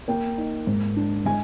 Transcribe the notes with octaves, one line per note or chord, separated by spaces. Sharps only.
A#3 G5
D#4
G#2
D4
G#3 G#5